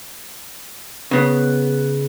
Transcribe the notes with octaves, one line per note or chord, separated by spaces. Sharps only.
C#3 B3